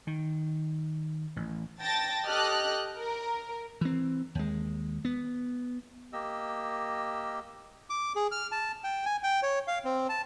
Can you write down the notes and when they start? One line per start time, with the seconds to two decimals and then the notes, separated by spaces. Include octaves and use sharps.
0.07 D#3
1.36 A1
1.81 G5 A5 A6 A#6
2.27 G4 A4 D#5 F6 F#6
2.98 A#4
3.81 E3 C4
4.35 D#2 G#3
5.05 B3
6.13 A#3 G4 D#5 E6
7.90 D6
8.16 G#4
8.32 F6
8.52 A5
8.84 G5
9.05 G#5
9.23 G5
9.43 C#5
9.68 F5
9.85 C4
10.09 A5